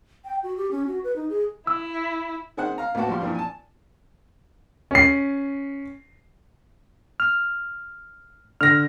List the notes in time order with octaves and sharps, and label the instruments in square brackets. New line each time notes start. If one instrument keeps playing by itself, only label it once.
[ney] G5
F#4
G4
C#4
F#4
B4
D#4
G#4
[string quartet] E4 [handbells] E6
[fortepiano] D#3 G#4 C5 F#5 F#6
F5 A#5
A1 D#2 B3 F#4 F#5 A5
F3 G3 F5 C6
G2 A#2 E3 F3
G#5 A5
[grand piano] C#4 C7
[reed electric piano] F6
[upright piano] D3 A#6 [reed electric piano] F6